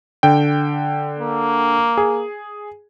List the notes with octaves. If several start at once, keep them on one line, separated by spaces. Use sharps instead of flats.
D3 G5
A#3
G#4